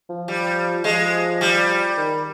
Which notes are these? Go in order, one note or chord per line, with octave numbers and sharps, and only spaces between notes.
F3
G3
F3 G#3
G3
D#3